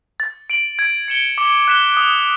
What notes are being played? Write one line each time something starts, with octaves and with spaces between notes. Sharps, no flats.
A6
D7 F#7
G#6
C#7 E7 G7
D6
F#6 B6 E7 G7
D#6